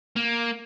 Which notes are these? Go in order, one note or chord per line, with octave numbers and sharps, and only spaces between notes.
A#3